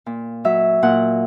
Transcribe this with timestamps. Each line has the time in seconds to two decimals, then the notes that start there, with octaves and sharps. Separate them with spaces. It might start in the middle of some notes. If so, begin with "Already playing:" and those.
0.06 A#2
0.45 F#3 E5
0.83 A#2 F#5